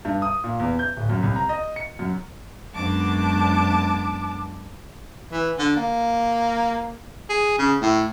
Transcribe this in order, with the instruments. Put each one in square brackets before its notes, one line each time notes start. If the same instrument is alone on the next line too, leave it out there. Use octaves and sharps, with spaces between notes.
[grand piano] G2
D#6
A#2
E2
G6
D1
F#2
C2
A#5
D#5
C#7
F#2
[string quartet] F#2 G#3 B3 D4 A5 D6
[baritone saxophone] E3
D3
A#3
G#4
C#3
A2